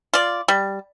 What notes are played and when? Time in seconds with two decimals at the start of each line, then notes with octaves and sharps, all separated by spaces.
0.14 F4 D5
0.48 G3